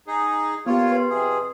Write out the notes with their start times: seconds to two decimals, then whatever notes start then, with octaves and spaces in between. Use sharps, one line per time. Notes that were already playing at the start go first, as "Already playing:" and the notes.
0.07 D#4 G#4
0.66 A#3 B3 F4 G4 C#5
0.91 B4 C6
1.10 F2 C3 G#4